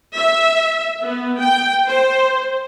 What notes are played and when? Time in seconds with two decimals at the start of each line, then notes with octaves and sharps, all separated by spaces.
0.17 E5
1.03 B3
1.41 G5
1.88 C5